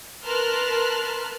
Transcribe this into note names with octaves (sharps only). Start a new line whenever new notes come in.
A#4 B4 A5 C6 F6 F#6